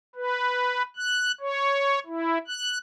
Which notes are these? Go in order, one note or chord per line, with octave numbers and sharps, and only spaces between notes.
B4
F#6
C#5
E4
F#6